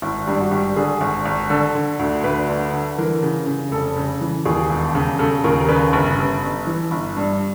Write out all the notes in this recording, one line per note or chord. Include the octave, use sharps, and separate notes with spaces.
G#1 E4
G2 G4
F#4
G#1 G4
D3 G#4
G#1
G#1
D3 A4
D3
D2
D2 B4
D3
D3
E3 A#4
C#3
C#3
F1 A4
C#3
E3
D#2 G#4
E1
C#3
C#3 A4
D#2 A#4
A#4
C#3 B4
G1
G1
G1
E3
G1
G2